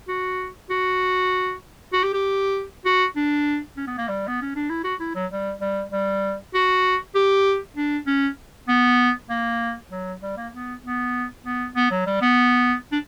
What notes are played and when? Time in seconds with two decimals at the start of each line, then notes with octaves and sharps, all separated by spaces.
0.08 F#4
0.70 F#4
1.93 F#4
2.03 G4
2.13 G4
2.85 F#4
3.16 D4
3.77 C#4
3.87 B3
3.98 A#3
4.08 G3
4.28 B3
4.42 C#4
4.56 D4
4.69 E4
4.84 F#4
5.00 E4
5.15 F#3
5.31 G3
5.61 G3
5.92 G3
6.54 F#4
7.15 G4
7.76 D4
8.07 C#4
8.68 B3
9.30 A#3
9.91 F#3
10.22 G3
10.37 A#3
10.53 B3
10.83 B3
11.45 B3
11.76 B3
11.91 F#3
12.06 G3
12.22 B3
12.92 D4